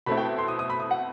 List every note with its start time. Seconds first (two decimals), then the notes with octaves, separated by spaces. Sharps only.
0.06 B2 A3 C4 E4 B5
0.17 G5
0.38 C6
0.48 D#6
0.59 D#6
0.70 B5
0.80 D#6
0.91 F#5